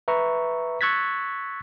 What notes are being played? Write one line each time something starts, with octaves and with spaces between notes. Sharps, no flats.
B4 E5 A#5 C#6
C#6 E6 F#6 G#6 A6 B6